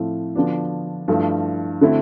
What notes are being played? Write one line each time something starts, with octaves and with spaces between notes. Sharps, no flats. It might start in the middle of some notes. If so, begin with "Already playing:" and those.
Already playing: A2 F3 A3 C4 E4
D3 F3 B3 D4
G2 F3 A3 E4
D3 A3 C4 E4